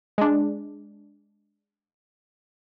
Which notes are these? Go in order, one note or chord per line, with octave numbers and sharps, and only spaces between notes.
G#3 D4